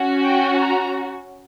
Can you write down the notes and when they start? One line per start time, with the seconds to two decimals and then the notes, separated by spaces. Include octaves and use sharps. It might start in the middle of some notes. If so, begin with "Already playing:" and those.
Already playing: C#4 F#4
0.22 G5
0.59 A#5